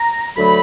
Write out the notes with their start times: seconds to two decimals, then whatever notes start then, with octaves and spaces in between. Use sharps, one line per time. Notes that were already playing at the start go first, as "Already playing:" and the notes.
Already playing: A#5
0.36 D2 D3 F#3 A3 B5